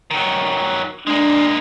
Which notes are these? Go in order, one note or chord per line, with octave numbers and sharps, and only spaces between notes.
D#3 F#3
G#3 A#3 D4